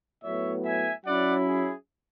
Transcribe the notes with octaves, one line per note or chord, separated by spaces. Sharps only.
A2 F#3 B3 C#5 E5
E5 G#5
F#3 C#4 E4 D5 F#5
G#4